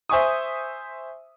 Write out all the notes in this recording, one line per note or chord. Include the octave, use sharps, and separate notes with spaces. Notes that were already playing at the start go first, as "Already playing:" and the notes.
C5 E5 G#5 C#6 D#6